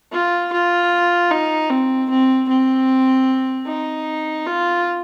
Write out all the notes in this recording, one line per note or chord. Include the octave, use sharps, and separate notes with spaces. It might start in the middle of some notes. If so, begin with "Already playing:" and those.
F4
F4
D#4
C4
C4
C4
D#4
F4